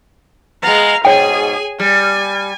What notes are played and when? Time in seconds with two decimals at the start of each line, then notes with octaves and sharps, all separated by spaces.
0.63 G#3 B3 F5 A#5
1.05 G#2 B2 G#4 C#5 G5 G#5
1.80 G3 G#5